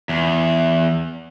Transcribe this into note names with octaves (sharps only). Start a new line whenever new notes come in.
E2